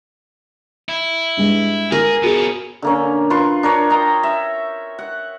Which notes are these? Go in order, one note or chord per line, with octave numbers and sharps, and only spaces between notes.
E4
G2 G#3
G#4 A#4
B2 C#4 F#4 G#4
D3 A#3 C#4
F4 B4 C6 C#6
D4 A#4 C#5
D#5 G5 A#5
E5
F#5